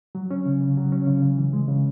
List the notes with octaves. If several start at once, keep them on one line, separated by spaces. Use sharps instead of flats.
F#3
C#4
C#3
C#3
F#3
C#4
C#3
C#3
E3
G#3
C#3